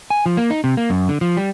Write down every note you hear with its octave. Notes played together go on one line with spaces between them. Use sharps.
G#5
F3
A#3
D#4
C3
A#3
F#2
D3
F3
G3